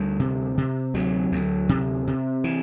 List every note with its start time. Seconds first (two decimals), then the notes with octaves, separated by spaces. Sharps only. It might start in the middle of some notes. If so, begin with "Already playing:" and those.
Already playing: D2 G3
0.20 C3
0.58 C3
0.94 D2 F#3
1.32 D2
1.69 C3
2.07 C3
2.44 E3